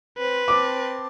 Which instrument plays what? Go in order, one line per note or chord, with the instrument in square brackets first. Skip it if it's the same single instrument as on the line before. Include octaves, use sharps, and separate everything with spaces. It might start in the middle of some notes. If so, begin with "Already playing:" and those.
[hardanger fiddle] C4 C5 [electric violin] B4
[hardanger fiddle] C4 A5 [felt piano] D6